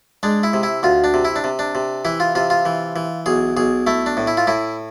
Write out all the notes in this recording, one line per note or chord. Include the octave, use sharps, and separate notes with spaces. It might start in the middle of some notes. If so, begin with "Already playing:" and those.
G#3 D4
E4
C3
E4
D2 F4
D4
C3
E4
D4
C3
D4
C3
E3 E4
F4
C3 F4
F4
E3
E3
B1 G#4
B1 G#4
A3 E4
D4
A2
E4
F4
A2 E4